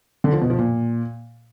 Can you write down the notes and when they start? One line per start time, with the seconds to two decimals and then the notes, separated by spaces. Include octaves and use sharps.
0.24 D3
0.33 F3
0.41 B2
0.50 F3
0.58 A#2